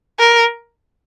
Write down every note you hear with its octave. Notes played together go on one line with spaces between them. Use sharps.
A#4